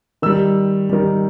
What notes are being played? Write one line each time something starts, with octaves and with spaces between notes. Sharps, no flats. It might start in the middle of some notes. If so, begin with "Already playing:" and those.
D#3 G3 E6
D#3 G3